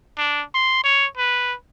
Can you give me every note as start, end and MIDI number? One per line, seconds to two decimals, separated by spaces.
0.18 0.43 62
0.54 0.80 84
0.84 1.07 73
1.17 1.54 71